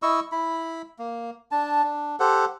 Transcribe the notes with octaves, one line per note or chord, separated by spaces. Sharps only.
E4 D#5 C#6 E6
E4 B5
A#3
D4 A5
D4
G4 A4 C5 F#5